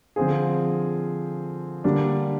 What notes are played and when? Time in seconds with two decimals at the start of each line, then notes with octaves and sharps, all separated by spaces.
0.16 D3 F3 C4 F4 G#4
1.84 D3 G3 A#3 D4